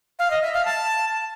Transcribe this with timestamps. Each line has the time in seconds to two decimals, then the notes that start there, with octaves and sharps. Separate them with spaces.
0.19 F5
0.31 D#5
0.42 E5
0.54 F5
0.65 A5